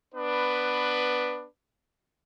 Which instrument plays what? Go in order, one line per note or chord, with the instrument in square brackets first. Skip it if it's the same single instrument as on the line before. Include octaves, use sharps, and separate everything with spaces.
[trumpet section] B3 D4 B4